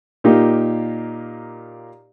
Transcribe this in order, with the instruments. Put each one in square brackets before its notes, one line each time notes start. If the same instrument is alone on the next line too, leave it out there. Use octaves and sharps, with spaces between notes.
[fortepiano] A#2 A#3 D#4 G4